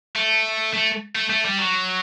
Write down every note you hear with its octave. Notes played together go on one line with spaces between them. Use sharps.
A3
A3
A3
A3
G3
F#3